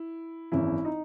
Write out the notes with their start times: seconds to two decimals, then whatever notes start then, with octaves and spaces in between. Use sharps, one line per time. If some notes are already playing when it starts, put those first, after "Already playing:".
Already playing: E4
0.52 G#1 F#2 E3 E4
0.85 D#4